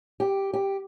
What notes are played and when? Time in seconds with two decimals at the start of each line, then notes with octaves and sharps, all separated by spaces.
0.20 G4
0.53 G4